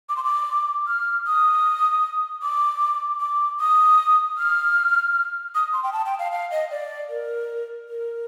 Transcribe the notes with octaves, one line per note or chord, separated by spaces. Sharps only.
D6
C6
D6
F6
D#6
D6
D6
D#6
F6
D#6
C6
G5
A5
G5
F5
F5
D#5
D5
A#4
A#4